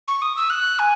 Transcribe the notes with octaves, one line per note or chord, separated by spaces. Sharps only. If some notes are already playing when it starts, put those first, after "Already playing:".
C#6
D#6
E6
F#6
G#5